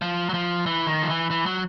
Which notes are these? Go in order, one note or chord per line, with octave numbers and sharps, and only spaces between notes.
F3
F#3
F3
E3
D#3
F3
E3
E3
F#3